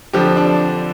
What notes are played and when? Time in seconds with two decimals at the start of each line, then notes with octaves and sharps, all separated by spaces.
0.13 F2 D3 F3 G4
0.37 D4